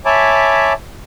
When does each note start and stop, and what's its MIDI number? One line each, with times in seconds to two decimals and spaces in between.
0.05 0.73 73
0.05 0.73 76
0.05 0.73 80
0.05 0.73 81
0.05 0.73 83
0.05 0.73 86